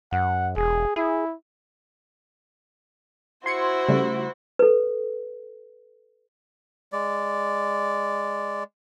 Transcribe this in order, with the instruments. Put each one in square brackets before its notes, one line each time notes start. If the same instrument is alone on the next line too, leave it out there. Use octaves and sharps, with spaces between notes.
[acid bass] F#2 [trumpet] F#5
[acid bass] E1 [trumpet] G#4
[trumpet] E4 [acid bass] G#4
[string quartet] E4 F#4 C5 [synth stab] C6 G#6 C#7
[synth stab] C#3 G3 A3
[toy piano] A4 B4
[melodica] G#3 D5